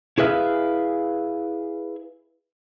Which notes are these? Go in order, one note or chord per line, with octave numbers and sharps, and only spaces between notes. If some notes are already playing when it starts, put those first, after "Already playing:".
E4 G#4 B4 E5 F5